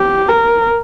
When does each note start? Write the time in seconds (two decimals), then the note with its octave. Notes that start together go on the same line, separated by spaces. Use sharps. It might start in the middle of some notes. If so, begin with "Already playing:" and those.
Already playing: G4
0.29 A#4